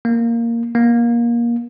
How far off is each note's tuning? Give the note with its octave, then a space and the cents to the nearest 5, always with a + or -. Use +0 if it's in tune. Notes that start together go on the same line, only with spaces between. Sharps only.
A#3 -5
A#3 +20